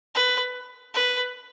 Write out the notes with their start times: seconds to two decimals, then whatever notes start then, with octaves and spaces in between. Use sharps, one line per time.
0.15 B4
0.94 B4